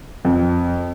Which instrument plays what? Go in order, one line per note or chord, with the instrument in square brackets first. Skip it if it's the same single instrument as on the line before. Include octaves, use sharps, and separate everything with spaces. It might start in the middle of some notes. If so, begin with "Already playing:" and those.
[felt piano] F2